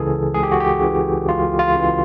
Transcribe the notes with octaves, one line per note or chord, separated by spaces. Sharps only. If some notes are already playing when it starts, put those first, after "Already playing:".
Already playing: C#2 C#3 E3 G#4 A4
C#2 G#4
G4
F#4
G4
C#3 E3
C#2 F4
F4
C#3 E3